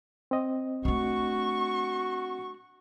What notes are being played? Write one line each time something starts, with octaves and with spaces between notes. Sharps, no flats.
C4 D#5
A3 D4 F#4 C#6